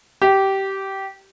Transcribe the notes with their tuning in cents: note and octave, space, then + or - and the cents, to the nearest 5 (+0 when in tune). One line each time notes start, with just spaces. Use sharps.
G4 -15